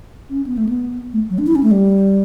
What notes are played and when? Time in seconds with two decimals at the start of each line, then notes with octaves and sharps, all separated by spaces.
0.30 C#4
0.47 B3
0.58 A3
0.69 B3
1.13 A3
1.30 F#3
1.38 D4
1.47 E4
1.55 C#4
1.63 A3
1.71 G3